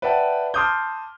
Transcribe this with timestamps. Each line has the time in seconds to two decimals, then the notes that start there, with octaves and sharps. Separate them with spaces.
0.02 B4 D5 E5 F#5 G5 A5
0.54 A5 C6 D6 D#6 F6 G6